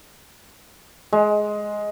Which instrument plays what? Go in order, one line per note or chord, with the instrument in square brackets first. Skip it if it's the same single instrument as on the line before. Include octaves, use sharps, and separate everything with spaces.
[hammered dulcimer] G#3